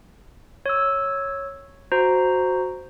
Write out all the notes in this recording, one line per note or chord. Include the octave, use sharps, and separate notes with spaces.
C#5 E6
F#4 C5 A#5